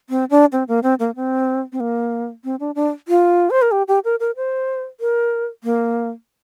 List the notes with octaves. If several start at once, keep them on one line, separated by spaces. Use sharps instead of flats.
C4
D4
C4
A#3
C4
A#3
C4
C4
A#3
C4
D4
D4
F4
C5
A#4
G4
G4
A#4
A#4
C5
A#4
A#3